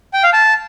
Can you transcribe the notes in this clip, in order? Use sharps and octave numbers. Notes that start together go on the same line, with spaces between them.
G5
F5
A5